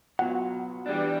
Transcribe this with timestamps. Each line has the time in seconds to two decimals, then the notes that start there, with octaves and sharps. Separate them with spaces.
0.19 F#3 B3 F4 F#4 F#5
0.86 E3 G3 D4